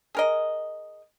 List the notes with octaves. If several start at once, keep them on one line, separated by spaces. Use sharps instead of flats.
G#4 A#4 D#5